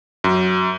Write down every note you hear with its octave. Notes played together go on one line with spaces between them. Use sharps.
F#2